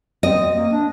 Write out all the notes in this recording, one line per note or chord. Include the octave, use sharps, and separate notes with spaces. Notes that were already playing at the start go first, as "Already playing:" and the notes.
C4 D#5
A#3
D4